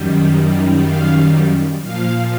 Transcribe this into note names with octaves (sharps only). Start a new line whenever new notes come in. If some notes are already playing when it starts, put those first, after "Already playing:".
Already playing: F#2 D#3 G3
F5
A#2 F3 F5